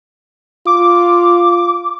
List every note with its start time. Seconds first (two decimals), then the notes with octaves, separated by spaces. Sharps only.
0.67 F4 D6